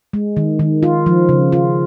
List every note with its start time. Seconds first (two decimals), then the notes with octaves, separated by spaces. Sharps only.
0.13 G#3
0.37 D#3
0.59 D#3
0.83 F4
1.06 F3
1.29 C#3
1.52 F4